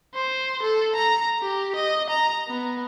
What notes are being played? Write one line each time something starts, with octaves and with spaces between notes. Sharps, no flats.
C5
A4
A#5
G4
D#5
A#5
B3